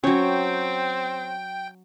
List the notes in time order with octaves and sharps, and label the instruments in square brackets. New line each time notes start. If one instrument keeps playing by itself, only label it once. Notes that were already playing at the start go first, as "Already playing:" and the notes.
[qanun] F#3 C#5 [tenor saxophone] C4 [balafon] C#4 [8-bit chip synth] G5